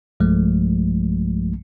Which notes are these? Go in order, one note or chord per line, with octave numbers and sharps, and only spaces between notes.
B1 G2 F3 G#3 A3